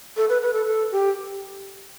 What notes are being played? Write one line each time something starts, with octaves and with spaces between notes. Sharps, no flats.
A4
B4
B4
A4
A4
G4